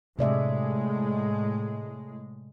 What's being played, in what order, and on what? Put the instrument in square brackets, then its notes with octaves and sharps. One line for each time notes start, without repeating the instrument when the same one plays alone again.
[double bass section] A2 G#3 [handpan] C3 D5 E5